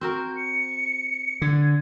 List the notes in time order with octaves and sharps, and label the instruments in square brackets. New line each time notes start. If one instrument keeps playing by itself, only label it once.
[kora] C4 F#4 A#4 [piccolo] G6
[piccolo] C#7
[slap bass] D3 [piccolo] G#6